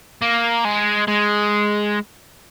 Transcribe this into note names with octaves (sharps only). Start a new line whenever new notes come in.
A#3
G#3
G#3